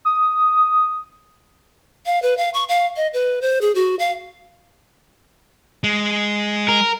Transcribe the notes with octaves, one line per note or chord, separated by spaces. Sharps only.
D#6
F5
B4
F5
C#6
F5
D#5
B4
C5
G#4
F#4
F5
G#3
A#4